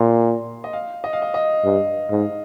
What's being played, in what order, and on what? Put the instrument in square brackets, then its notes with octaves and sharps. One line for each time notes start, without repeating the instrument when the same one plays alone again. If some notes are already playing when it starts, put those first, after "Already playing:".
Already playing: [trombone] A#2 [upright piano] C6
[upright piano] D#5
F5
D#5
F5
D#5
D#5
[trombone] G2
G#2